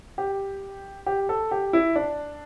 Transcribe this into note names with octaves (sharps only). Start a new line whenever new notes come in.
G4
G4
A4
G4
E4
D4